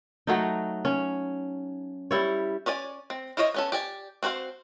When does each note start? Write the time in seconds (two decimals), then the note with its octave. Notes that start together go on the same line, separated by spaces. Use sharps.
0.27 F#3 A3 D#4
0.85 C#4
2.11 G3 E4 C#5
2.66 C#4 C#5 D5 G#5
3.10 C4
3.37 E4 F4 C5 C#5 D#5
3.54 B3 C#4 A4
3.72 G4 D5 G#5
4.23 C4 F#4 B4 C5 F5